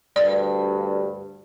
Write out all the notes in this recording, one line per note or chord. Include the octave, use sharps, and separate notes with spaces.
D2 G2 D5